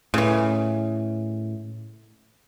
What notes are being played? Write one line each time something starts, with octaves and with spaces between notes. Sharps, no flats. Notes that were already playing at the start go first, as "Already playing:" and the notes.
A2 C#3 E3